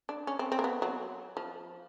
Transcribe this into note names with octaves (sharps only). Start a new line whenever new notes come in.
D4
C#4
C4
C4
A#3
B3
F#3
F3